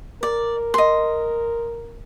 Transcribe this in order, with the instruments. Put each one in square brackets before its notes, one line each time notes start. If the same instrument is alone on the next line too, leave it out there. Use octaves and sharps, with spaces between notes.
[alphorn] A#4 [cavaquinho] D5
[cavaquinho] D#5 C6